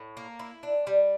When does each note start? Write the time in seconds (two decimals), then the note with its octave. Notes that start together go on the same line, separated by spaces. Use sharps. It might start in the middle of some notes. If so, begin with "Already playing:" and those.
Already playing: A2
0.17 A#3
0.39 E4
0.63 D4
0.87 G3